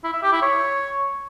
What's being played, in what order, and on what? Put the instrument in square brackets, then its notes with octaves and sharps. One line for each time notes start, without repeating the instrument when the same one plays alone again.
[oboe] E4
E5
G4
E4
C#5